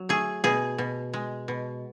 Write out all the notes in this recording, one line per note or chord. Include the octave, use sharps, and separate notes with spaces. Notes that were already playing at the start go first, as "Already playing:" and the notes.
Already playing: F#3
A3 G#4
B2 G#4
B2
G#3
B2